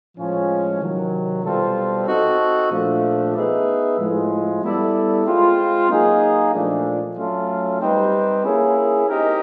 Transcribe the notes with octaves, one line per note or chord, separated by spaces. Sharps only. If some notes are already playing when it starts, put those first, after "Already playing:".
A2 F3 G#3 C#4
C3 D#3 F#3
B2 G3 C4 F4 A4
C4 D#4 F#4 A4
A#2 F3 A3 D4
B3 D#4 G#4 B4 E5
A2 F3 G#3
G3 B3 E4 A4 D5
G#3 C4 F4
F#3 A#3 D#4 G#4
A#2 F3 A3 D4
F#3 A3 C#4 F4 A4
G3 C4 D#4 G4 B4
A#3 C#4 E4 G#4
C4 D#4 G4 A#4 D#5